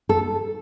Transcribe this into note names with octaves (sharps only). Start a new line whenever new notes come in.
A4